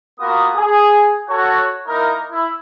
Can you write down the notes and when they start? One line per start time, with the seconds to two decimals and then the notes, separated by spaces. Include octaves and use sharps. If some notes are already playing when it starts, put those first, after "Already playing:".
0.20 A#3 B3 F4 F#4 A#4 D#6
0.55 G#4
1.29 F#4 A4 C#5
1.87 A#3 D#4 E4 A#4
2.30 E4